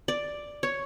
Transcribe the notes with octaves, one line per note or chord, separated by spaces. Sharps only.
D5
C#5